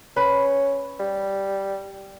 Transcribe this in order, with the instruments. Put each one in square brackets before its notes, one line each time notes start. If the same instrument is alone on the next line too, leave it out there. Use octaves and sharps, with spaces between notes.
[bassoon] C#4 [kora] B4
[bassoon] G3